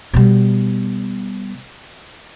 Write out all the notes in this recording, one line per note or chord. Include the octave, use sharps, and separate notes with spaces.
B2 G3